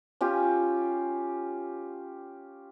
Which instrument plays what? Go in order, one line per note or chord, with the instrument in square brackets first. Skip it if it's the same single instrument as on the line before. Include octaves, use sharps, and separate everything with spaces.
[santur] C#4 F4 G4